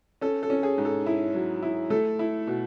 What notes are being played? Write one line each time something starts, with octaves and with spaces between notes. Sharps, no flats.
C#4 A4
A4
C#4
G#4
G#2
A4
E4
F#3
E4
A3 A4
E4
B2